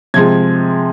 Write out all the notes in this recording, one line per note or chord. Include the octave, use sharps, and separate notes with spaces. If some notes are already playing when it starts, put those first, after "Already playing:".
C3 F3 G#3 G#6